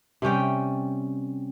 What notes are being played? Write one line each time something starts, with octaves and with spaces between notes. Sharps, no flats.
C3 G3 C#4 G5